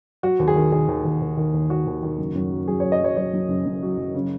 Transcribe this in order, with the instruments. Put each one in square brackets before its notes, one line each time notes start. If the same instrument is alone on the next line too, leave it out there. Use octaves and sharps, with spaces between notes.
[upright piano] F#3 F#4
D#2
G#4
D#3
D#3 G#4
D#2
D#2
D#2
D#3
D#2
D#3 F#4
D#2
D#3
F#1
F#2
F#3
F#3 G#4
F#3 C#5
D#5
F#3 C#5
F#3 C#5
F#2
F#1
F#2
F#3
F#1
C#3